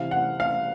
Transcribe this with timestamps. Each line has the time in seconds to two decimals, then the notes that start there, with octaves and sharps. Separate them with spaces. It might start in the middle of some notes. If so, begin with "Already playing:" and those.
Already playing: C3 E3 F5
0.11 F#5
0.40 F5